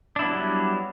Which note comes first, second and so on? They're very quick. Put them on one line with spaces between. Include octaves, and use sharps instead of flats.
D4 E4 B3 F#3 G3